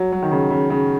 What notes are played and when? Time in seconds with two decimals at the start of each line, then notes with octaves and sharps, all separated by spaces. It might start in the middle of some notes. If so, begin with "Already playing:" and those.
Already playing: F#3
0.12 F#3
0.22 D#3
0.31 C#3
0.50 C#3
0.70 C#3